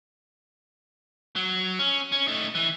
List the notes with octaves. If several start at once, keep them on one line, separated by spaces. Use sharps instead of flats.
F#3
C#4
C#4
A3 D#4
E3